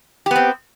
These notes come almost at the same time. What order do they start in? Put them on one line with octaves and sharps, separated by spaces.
G4 B3 C4